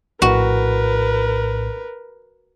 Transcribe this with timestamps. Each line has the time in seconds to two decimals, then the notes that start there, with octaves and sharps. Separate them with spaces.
0.22 A#1 A2 F#4 A#4 B4